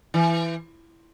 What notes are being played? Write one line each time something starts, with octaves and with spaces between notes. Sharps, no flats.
E3